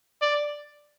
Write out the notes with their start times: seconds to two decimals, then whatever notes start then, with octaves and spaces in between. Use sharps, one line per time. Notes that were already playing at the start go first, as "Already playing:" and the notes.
0.22 D5